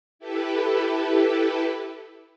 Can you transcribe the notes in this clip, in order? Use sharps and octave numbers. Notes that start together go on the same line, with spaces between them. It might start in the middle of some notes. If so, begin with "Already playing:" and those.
E4 G4 A4 B4